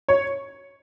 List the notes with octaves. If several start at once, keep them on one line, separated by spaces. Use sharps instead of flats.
C#5